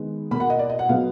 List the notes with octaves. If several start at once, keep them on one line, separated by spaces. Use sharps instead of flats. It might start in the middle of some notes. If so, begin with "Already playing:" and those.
Already playing: D#3 G#3 B3
B2 A#3 B5
F#5
D#5
D5
D#5
F#5
B2 F#3 B3 F5